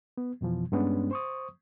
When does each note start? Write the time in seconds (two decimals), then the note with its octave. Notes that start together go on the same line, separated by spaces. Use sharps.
0.17 B3
0.41 F2 B2 E3 F3
0.72 G2 G#3 B3 C#4 D4
1.11 C5 C#6 D#6